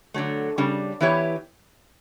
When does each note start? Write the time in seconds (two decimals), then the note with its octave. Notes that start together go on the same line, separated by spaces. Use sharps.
0.14 D3 F#3 A3
0.58 C#3 G3 D4
1.01 E3 B3 E4 G4 C#5